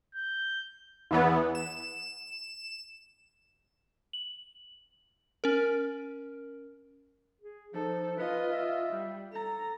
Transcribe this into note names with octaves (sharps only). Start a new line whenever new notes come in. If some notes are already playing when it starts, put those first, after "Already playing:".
G6
E2 E3 B3
E7
F#7
C#4 A#4
G#4
F3 D#4 A4
F4 B4 D#5
E5
G3
A4 A#5